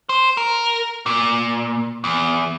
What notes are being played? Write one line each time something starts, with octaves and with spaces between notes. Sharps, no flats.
C5
A#4
A#2
E2